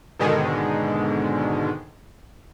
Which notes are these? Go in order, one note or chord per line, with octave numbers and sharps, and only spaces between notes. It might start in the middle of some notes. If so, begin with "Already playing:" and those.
G#2 B2 D3 D#3 G#3